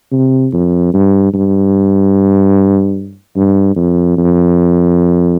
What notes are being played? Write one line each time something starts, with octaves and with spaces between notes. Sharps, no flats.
C3
F2
G2
G2
G2
F2
F2